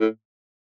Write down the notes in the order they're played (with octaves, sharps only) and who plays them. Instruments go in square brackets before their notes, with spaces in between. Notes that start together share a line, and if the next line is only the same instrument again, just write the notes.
[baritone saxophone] A2